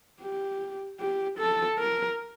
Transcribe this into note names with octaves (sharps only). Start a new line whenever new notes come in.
G4
G4
A4
A#4